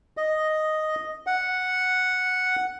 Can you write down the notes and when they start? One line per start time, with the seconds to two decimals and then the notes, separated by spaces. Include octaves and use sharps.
0.17 D#5
1.27 F#5